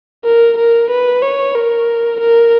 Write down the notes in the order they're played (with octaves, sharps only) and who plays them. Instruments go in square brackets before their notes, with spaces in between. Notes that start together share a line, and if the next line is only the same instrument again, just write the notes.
[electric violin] A#4
A#4
B4
C#5
A#4
A#4